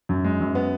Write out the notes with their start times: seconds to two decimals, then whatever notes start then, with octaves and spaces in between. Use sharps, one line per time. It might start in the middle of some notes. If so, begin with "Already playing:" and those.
0.09 F#2
0.24 G#3
0.40 F#2
0.55 B3